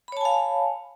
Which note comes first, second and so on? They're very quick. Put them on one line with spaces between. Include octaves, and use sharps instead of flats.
B5 C#5 A5 G#5 F5